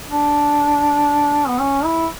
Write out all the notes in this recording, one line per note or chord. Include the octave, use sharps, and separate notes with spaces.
D4
B3
C#4
E4